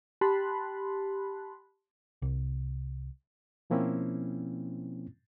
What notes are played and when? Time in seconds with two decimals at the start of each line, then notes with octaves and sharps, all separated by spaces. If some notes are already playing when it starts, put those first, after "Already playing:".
0.21 G4 A5 B5 C6 F#6
2.22 C2
3.70 B2 F3 A#3 C4 C#4 E4